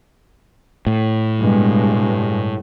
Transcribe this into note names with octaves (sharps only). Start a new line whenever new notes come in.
A2
G2 B2 G#3